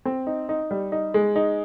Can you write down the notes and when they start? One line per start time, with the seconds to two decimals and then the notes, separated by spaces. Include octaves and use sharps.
0.05 C4
0.27 D#4
0.49 D#4
0.71 G3
0.92 D#4
1.14 G#3
1.36 D#4